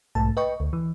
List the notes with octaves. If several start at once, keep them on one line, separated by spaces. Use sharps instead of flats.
B1 G#2 A3 A5
B4 D#5 G5 C#6
D2
E3